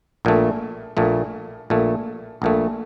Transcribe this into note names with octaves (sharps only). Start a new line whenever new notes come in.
A#1 A#2 A3
A#1 A#2 A3
A#1 A#2 A3
A#1 A#2 A3